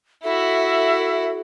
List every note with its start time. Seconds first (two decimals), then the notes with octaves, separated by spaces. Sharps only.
0.23 E4 F#4 A4 E5